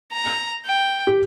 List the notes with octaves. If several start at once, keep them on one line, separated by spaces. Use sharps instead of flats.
A#5
G5
G4